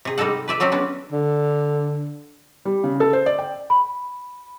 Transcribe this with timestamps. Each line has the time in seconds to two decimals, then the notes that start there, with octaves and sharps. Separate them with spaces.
0.05 C3 G#4
0.18 G3 G#3 D#4 A4 F#5
0.48 B4 D5 E5
0.60 F#3 C4 C#4 D5 E5
0.72 B3 C#4 D4
1.12 D3
2.65 G3
2.84 C#3
3.00 A4
3.13 C5
3.26 D5
3.39 G5
3.70 B5